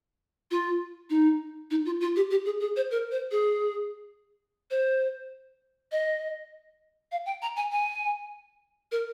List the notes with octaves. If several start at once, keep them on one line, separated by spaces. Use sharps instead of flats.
F4
D#4
D#4
F4
F4
G4
G4
G#4
G#4
C5
A#4
C5
G#4
C5
D#5
F5
G5
A#5
G#5
G#5
A#4